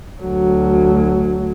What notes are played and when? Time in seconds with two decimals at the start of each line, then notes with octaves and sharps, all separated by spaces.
0.21 D2 F#3